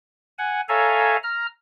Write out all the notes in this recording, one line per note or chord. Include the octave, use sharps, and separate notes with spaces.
F#5 G#5
A4 C#5 E5 F5 G#5 A#5
A#5 F6